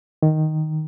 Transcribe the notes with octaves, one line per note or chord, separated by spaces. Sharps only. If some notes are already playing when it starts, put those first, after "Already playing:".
D#3